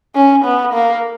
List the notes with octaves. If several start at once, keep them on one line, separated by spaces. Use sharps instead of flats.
C#4
B3
A#3